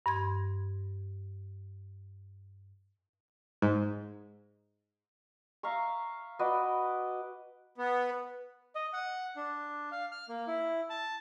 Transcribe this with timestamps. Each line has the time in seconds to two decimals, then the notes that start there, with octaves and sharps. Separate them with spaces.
0.06 G2 C6 G#6
3.62 G#2
5.63 E5 F5 A#5 C#6
6.39 F#4 B4 D5 D#5
7.78 B3
8.75 D#5
8.93 F#5
9.36 D4
9.92 F5
10.12 F6
10.29 A#3
10.47 E4
10.90 A5